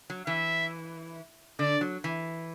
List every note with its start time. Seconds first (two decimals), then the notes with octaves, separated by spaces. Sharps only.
0.10 F#3
0.26 E3 E5
1.59 D3 D5
1.81 F#3
2.04 E3